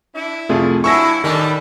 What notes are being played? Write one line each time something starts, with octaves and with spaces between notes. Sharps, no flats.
D4 E4
C2 F2 F3 A3 F4 G#4
G2 F#3 E4 G#5 A5 C#6 E6 A#6
A2 D#3 G3 D4 D#5 G#5